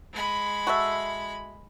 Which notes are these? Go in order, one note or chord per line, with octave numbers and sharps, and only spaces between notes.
G#3 B5
F#4 A4 E5